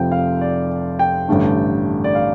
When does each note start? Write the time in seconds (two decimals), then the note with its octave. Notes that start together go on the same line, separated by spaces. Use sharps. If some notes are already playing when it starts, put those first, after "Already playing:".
Already playing: F1 F2 C3 F3 C4 G5
0.12 F5
0.41 D5
0.99 G5
1.28 A1 G2 D3 A3 D4
2.04 D5
2.15 F5